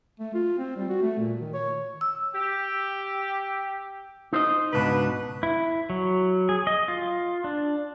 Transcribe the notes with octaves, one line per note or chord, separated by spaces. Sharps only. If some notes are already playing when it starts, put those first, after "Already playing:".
A3
F4
C4
G3
F#4
A3
A#2
D#3
C#5
E6
G4
D#4 C5 D#5
C#2 G#2 B2 D4 D#4 B4
E4
F#3
G#4
D#5
F4
D4